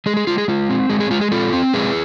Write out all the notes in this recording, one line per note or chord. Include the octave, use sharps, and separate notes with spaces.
G#3 G#4
G#4
G#3 F4
G#4
G#3 F4
C4
G#3 G#4
G#4
G#3 F4
G#4
C4 F4 A4
C4
G#3 G#4 B4